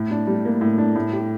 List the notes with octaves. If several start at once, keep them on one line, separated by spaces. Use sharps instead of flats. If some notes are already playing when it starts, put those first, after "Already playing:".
Already playing: A2
D4
G3
A#3
A2
D4
A2
G4